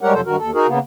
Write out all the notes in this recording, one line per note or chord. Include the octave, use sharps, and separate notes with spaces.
G3 G#3 G4 A#4 C#5 F#5
F2 C3 F3 F#3 A4 C5
G2 D#3 F#4 A#4
D#2 A4
D#4 F#4 G#4 A#4
C#3 A#3 B3